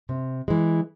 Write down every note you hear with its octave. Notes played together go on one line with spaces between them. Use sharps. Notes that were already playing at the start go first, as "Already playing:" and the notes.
C3
E3 G#3